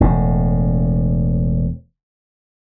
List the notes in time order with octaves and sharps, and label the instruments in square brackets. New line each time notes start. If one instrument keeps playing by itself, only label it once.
[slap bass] E1 A2